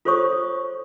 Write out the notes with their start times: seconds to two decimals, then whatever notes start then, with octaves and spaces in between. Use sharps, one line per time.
0.05 F4 A4 C5 C#5 C#6 D#6